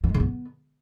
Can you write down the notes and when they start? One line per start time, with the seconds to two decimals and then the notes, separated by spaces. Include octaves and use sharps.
0.04 F#3
0.09 G#3
0.14 C#3
0.20 B3